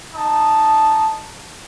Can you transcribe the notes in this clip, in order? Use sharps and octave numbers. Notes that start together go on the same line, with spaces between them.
D#4 A5